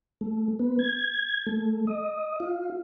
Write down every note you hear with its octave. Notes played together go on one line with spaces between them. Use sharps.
A3
B3
G#6
A3
D#5
F4